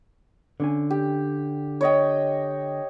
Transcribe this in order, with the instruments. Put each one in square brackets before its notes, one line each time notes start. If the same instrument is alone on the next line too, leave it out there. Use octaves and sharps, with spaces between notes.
[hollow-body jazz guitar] D3 C#4 G#5
[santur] G4
C#5 D#5 G5